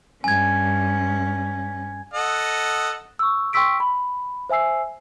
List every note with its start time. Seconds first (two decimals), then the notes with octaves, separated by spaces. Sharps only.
0.24 G2 C#4 G#5 G#6
2.14 A4 D#5 F#5
3.19 C#6 E6
3.53 G5 C6 C#6 E6 B6 D7
3.80 B5
4.49 C5 E5 G#5 E6 C7